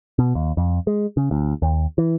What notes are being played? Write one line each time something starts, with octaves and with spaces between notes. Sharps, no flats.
B2
D#2
F2
G#3
C#3
D2
D#2
E3